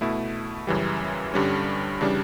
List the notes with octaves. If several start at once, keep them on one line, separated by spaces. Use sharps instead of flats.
B2 A3 E4
F#2 C#3 E3 G3
G2 D3 G3 C#4
C#3 E3 G3 D4